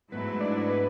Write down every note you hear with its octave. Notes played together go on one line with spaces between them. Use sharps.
G#2 F#3 A3 B3 E4 B4
D4 D5
B3 B4